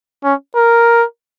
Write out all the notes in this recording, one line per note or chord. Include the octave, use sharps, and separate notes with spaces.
C#4
A#4